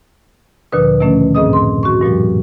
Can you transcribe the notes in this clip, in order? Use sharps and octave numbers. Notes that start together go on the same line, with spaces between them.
D2 A#2 D3 F3 B4 D#6
B2 D#3 F3 A3 C#4
F#2 A2 C4 G#4 D#5 D#6
C6
F#4 C#6
G2 A#2 F3 G3